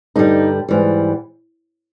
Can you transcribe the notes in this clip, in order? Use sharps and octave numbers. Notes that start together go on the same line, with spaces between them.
G2 D3 G3 D#4
G#2 E3 G3